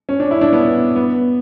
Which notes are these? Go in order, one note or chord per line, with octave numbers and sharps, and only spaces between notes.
C#4
D4
E4
D4
B3
B3